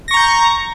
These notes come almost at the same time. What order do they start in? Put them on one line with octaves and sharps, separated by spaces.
A#6 C#6 A#5 G6